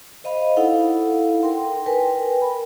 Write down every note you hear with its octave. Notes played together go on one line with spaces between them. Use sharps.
C5 D#5 F5 B5
D#4 E4 A4 F5 F#5
A#4 G5 C6
A#4 B4 G5 G#5
B5